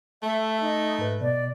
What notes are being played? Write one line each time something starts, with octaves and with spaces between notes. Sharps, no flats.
A3 E5
D#4
G#2 B4
B2 D5